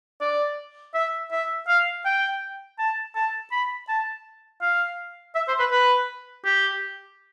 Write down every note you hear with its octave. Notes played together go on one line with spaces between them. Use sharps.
D5
E5
E5
F5
G5
A5
A5
B5
A5
F5
E5
C5
B4
B4
G4